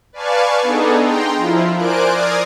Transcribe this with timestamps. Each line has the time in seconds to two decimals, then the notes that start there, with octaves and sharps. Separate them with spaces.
0.13 B4 D5 F5 G#5 A5 C#6
0.63 B3 D4 D#4 G#4 A4
1.00 G5 A#5 C6
1.36 F3 E4 F4
1.76 A#4 C5 D5 G#5 F#6 D7
2.11 D5 D#6 F6 G#6 A#6 C7